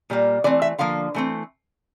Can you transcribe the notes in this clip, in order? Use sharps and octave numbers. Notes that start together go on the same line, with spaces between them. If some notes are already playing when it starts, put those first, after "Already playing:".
A#2 G3 A#3
E3 A3 C4 D5
E5
D3 F3 A#3 F5
E3 A3 C4